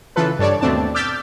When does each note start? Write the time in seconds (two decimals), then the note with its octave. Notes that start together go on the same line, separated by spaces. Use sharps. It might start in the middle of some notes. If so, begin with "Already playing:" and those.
0.16 C#3 E3 F4 A4 B4
0.39 G2 A4 C#5 D5
0.61 D#2 B2 A3 C4 D4 A5
0.95 D6 E6 F6 G6 A6 B6